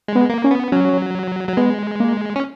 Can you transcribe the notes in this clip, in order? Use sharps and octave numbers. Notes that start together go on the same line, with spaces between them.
G#3
B3
A#3
C#4
B3
F#3 C#4
F#3
G#3 B3
A#3
C#4